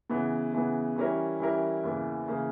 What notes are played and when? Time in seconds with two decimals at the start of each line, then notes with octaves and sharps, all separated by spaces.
0.10 C#3 E3 B3
0.53 C#3 E3 B3
0.96 E3 G3 C#4 E4 A#4
1.40 E3 G3 C#4 E4 A#4
1.84 E2 C#3 E3 A#3
2.28 C#3 E3 A#3